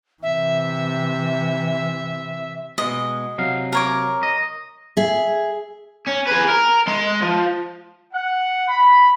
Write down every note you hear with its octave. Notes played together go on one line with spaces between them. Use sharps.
C3 E3 E5
B2 G#3 D#5
C3 F#3 F5
A#4 C#5 D6
D#5
G#4 E5
C#4
G#4 B4
A#4
G#3 C6
F3
F#5
B5